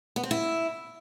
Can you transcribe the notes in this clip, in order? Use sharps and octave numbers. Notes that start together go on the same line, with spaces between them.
B3
C4
E4